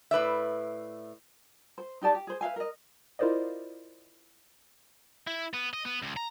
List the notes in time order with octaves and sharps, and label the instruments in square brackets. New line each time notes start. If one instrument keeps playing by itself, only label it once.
[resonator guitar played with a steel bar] A2 B4 D5 E5
[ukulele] C5
D#4 G4 D5 A5
G4
G#4 C5
B4 E5 F5 G#5
A#4 D#5
[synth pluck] E4 F4 A#4 C5 D5 D#5
[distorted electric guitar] E4
B3
D#5
B3
C#2
A#5